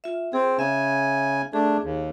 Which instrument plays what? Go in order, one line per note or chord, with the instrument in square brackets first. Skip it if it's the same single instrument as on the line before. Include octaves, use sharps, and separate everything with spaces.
[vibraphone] F4 E5
[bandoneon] C4 [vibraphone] G#4
[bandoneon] C#3 G#5 [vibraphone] E5
[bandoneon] A3 D4 [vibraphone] G#4
[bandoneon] D#2